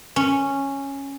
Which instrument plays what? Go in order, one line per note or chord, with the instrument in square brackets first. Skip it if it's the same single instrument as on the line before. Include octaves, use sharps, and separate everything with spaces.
[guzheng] C#4